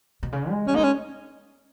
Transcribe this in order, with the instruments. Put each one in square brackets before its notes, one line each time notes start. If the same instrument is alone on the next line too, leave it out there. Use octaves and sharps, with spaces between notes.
[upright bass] B2
C#3
G#3
[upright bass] G3 [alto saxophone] C#4
[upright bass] G#3 A#3 [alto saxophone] D#4
[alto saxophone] C#4